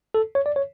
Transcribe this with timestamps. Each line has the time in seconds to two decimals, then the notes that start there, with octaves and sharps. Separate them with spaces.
0.14 A4
0.35 C#5
0.46 D5
0.56 C#5